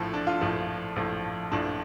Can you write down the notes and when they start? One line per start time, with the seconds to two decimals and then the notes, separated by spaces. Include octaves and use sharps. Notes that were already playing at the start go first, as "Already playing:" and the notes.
Already playing: A#1 A2 F3 A4
0.14 D4
0.27 F4
0.41 A#1 A2 F3
0.96 A#1 A2 F3
1.52 A#1 A2 F3 D4